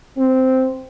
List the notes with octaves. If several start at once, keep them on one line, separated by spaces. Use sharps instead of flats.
C4